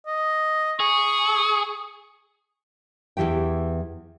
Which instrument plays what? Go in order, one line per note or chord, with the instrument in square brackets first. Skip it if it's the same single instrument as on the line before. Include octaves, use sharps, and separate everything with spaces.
[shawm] D#5
[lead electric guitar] G#4 [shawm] C#6
[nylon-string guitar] E2 D#3 E3 G4 G5